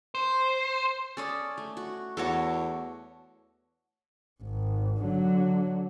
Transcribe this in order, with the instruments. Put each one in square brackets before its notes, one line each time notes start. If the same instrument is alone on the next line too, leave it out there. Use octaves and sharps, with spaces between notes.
[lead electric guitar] C5
[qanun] C#4 [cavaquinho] A4 D5 D#6
[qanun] A3
F#4
[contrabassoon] E2 [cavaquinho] F#4 A4 [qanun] C#5 D6
[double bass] G#1
D3 F#3